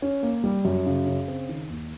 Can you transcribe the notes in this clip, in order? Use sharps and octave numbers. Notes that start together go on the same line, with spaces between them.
C#4
A#3
G3
F#2
C#3
C#3
C4
D#3
D#2